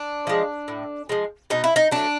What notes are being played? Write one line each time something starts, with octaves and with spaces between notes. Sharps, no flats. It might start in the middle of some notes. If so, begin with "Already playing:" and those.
Already playing: D4
F3 G#3
A2
F3 G#3
B2 D#4
E4
D#4
F#3 A3 D4